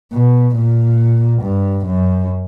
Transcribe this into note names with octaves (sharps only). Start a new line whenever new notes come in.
B2
A#2
G2
F#2